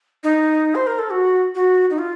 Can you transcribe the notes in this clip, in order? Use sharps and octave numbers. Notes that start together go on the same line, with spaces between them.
D#4
C5
A#4
A4
F#4
F#4
D#4
F4